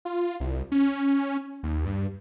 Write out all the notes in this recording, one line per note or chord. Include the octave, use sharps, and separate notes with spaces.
F4
C2
C#4
D#2
G2